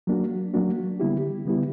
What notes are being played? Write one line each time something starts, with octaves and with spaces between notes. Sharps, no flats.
F#3 A#3 D4 F#4
F#3 A#3 D4 F#4
D3 G3 B3 E4 G4
D3 G3 B3 E4 G4